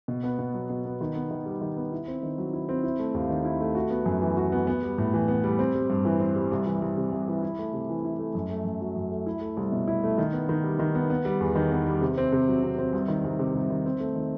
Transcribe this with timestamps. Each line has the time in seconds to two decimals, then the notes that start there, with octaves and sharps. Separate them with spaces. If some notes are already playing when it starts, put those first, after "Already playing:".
0.08 B2
0.23 B3
0.39 B2
0.54 F#3
0.70 B2
0.85 B3
1.01 D#3
1.15 B3
1.31 D#3
1.46 G3
1.61 D#3
1.77 B3
1.92 E4
2.08 C4
2.23 D#3
2.38 F#3
2.53 E4
2.69 C4
2.83 E4
2.99 A3
3.14 D#2
3.30 D#3
3.45 E4
3.61 A3
3.75 F#4
3.90 B3
4.06 F#2
4.22 E3
4.37 F#4
4.52 B3
4.67 B3
4.82 G3
4.98 A2
5.14 E3
5.28 B3
5.44 G3
5.59 C4
5.75 G3
5.90 G2
6.05 E3
6.20 C4
6.36 G3
6.52 C2
6.66 E3
6.82 C2
6.97 C3
7.12 C2
7.28 E3
7.43 E4
7.59 A3
7.73 C3
7.89 E3
8.04 E4
8.19 A3
8.35 F#2
8.50 A3
8.65 F#2
8.81 F#3
8.96 F#2
9.11 A3
9.26 E4
9.41 A3
9.57 C2
9.72 B2
9.88 E4
10.03 A3
10.18 D#3
10.33 B3
10.49 D#3
10.63 G3
10.79 D#3
10.95 B3
11.10 B3
11.25 G3
11.41 E2
11.55 D#3
11.71 B3
11.87 G3
12.01 C3
12.18 C4
12.32 C3
12.48 F#3
12.63 C3
12.78 C4
12.93 C2
13.08 D#3
13.24 C2
13.39 C3
13.55 C2
13.70 D#3
13.86 C4
14.00 A3
14.15 D#3